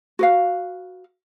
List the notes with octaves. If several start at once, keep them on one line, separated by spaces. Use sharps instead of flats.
F#4 B4 F5